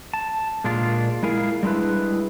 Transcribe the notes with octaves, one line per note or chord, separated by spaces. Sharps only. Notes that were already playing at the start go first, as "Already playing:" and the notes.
A5
A#2 G#3 D4 F4
G#3 E4 G#4 A#4 F5
G3 G#3 D4 E4 B4